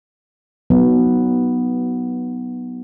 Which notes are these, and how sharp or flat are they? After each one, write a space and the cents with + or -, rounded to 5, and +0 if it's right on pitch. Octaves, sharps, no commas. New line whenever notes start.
F#3 +0 B3 +0 D#4 +0